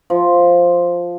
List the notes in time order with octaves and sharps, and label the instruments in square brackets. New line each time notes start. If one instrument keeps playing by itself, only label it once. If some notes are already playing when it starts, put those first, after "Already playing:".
[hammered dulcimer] F3